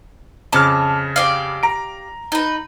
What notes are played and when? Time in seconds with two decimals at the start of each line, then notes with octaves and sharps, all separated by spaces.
0.52 F2 C#3 A5 D6 F6
1.16 G4 D5 F5
1.63 A#5 D7
2.32 D#4 B4